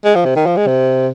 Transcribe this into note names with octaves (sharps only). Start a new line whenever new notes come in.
G#3
F3
C3
D#3
F3
G#3
C3